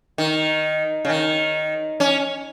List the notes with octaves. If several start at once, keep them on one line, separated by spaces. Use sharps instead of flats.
D#3
C#3
D#3
C#4